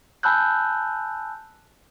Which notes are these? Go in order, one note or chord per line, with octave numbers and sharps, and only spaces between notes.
G#5 A5 B5 E6 F#6 G6